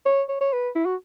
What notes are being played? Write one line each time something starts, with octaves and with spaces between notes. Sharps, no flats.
C#5
C#5
C#5
B4
E4
F#4